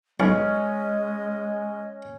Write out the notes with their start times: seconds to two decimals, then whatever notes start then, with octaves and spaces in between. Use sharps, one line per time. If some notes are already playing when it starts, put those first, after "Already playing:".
0.20 B1 G#3 C#4 D#5